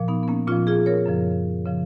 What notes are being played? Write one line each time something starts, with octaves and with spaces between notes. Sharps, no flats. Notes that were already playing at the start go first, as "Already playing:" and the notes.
Already playing: A#2 F3
B3 D#4
B3
A#3 C#4
A#2 F3 C#4 F4
F4 G#4
A#4 C#5
F#2 C#3 F3
C#3 F3